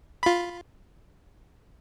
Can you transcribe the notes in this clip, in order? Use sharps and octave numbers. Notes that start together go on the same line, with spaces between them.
F4 B5